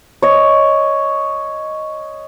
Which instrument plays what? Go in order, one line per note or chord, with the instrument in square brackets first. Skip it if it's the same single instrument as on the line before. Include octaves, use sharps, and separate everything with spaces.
[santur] C#5 D#5